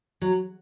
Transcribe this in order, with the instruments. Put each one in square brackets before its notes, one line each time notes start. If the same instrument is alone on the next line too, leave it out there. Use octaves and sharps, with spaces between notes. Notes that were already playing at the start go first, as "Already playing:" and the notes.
[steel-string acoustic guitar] F#3